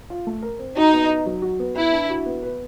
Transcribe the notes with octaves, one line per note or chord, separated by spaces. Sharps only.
F4
A3
A#4
C4
D#4 F#4
B3
D#4
F#3
F#4
B3
E4 B4
D4
F#4
B3
B4